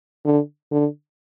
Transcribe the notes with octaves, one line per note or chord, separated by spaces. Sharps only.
D3
D3